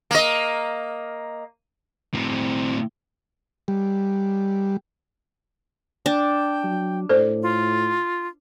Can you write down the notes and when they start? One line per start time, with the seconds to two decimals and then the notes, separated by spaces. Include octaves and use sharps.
0.11 A#3 D#5
2.14 A2 C4
3.68 G3
6.06 D4 G5
6.64 F#3
7.09 A2 A4 C5 D5
7.43 F4